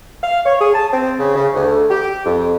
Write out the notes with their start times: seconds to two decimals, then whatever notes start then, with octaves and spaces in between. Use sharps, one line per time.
0.23 F5
0.46 C#5
0.60 G#4
0.73 A5
0.93 C4
1.19 C#3
1.36 C#3
1.54 D2
1.90 G4
2.25 F2